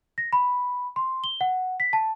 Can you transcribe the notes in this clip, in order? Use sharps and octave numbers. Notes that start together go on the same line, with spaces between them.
A#6
B5
C6
G7
F#5
B6
A5